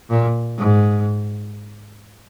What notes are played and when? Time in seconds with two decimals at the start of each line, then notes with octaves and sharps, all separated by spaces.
0.10 A#2
0.58 G#2